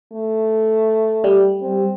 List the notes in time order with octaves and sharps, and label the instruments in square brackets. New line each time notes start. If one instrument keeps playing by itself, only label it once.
[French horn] A3
[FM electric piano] G3
[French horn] C4